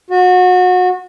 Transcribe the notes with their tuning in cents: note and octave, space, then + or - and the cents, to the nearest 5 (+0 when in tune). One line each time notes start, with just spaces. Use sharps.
F#4 -25